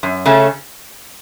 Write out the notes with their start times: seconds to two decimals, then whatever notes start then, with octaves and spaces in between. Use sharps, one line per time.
0.03 F#2
0.26 C#3 A3 C#4